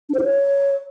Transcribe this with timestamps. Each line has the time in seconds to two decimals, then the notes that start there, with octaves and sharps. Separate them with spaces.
0.09 D4
0.14 C5
0.19 E4
0.24 C#5